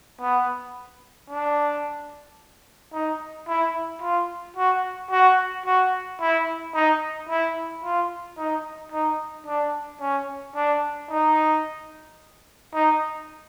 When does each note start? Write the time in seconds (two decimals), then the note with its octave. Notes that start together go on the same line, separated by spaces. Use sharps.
0.21 B3
1.30 D4
2.93 D#4
3.48 E4
4.02 F4
4.57 F#4
5.11 F#4
5.66 F#4
6.20 E4
6.74 D#4
7.29 E4
7.84 F4
8.38 D#4
8.92 D#4
9.47 D4
10.01 C#4
10.56 D4
11.10 D#4
12.74 D#4